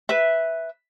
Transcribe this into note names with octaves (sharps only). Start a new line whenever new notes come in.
B4 E5